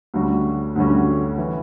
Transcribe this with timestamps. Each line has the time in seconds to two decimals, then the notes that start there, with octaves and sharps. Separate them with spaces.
0.14 D2 D3 G3 C#4 F#4
0.76 D2 D3 G3 C#4 F#4
1.38 E3